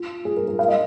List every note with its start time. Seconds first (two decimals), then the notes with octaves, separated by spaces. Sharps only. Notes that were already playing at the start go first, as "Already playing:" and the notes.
Already playing: F4
0.25 G#4
0.37 A#4
0.48 A#4
0.59 F5
0.68 D#5